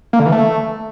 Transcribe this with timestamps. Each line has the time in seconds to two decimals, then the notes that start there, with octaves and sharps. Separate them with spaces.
0.13 A#3
0.20 D3
0.26 E3
0.32 A3